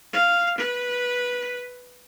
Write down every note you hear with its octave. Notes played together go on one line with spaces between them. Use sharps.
F5
B4